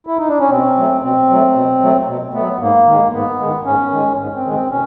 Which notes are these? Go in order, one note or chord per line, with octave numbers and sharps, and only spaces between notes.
E4
D#4
D4
C#4
B2 C4
F#3 A3
B2 C4
F#3 A3
B2
F#3 A3
B2
F#3 A3 B3
G#2 A#3
D#3 G#3
G#2 B3
D#3 G#3
G#2 C#4
D#3 G#3
G#2
C4
D#3 G#3
C4
B2 C#4